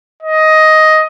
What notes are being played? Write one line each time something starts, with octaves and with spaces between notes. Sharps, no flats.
D#5